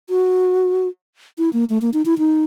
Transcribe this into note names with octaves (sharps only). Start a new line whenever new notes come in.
F#4
E4
A#3
A3
A#3
D#4
E4
D#4